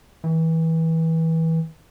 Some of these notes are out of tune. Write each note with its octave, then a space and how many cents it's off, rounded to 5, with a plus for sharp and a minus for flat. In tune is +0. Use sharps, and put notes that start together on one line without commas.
E3 -25